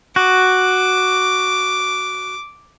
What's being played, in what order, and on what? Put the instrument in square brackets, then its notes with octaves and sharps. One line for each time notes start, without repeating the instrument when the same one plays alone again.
[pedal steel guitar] F#4 [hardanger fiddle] D6